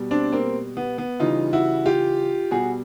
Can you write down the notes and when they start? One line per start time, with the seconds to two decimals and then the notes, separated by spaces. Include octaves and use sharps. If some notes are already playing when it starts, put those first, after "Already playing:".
Already playing: B2 G3
0.11 C4 D4
0.32 A#3 C4
0.77 B3
0.98 B3
1.20 C#3 E3 G3 D#4 F4
1.53 E4 F#4
1.86 F4 G4
2.51 B2 G3 F#4 G#4